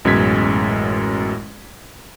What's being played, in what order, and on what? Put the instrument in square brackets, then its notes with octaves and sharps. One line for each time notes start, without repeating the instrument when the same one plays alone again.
[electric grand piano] A1 F#2 B2 G#3 G#6 B6